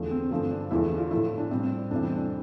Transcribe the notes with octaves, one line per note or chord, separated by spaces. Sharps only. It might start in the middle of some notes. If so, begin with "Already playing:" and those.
Already playing: E2 D3 F3 A3
C4
G2 D3 F3 A3 C4
D4
E2 D3 F3 A3 E4
F4
A2 F3 A3 E4
D4
A2 G3 C4
F2 C3 E3 G3 D4
C4
D4